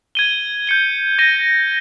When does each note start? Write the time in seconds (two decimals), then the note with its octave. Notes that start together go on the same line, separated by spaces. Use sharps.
0.15 G#6 D#7 G7
0.67 G6 C#7 G7
1.18 G6 A#6 D#7 G7